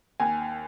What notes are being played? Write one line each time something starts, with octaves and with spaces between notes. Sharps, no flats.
D#2 G#5